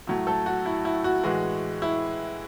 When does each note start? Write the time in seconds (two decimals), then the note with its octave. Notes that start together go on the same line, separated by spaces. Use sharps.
0.07 A2 F#3 A3
0.27 A3 A4
0.46 F#4
0.65 E4
0.85 E4
1.04 F#4
1.23 A2 E3 G#3 F#4
1.82 E4